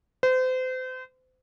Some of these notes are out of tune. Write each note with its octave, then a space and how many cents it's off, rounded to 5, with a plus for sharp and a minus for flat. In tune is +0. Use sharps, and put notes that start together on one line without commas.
C5 -35